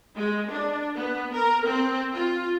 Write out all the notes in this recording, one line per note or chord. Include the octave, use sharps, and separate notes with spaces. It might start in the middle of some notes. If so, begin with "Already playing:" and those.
G#3
D4
B3
A#4
C4
F4